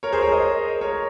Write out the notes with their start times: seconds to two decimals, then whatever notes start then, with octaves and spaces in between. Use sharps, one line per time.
0.03 A#4 C#5
0.12 G#4 C5
0.22 A#4 C#5
0.32 C5 D#5
0.81 A#4 C#5